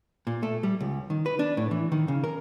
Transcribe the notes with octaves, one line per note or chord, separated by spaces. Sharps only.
A#2
A3
G3
C#2
D#3
B4
D4
A2
E3
D#3
C#3
A#4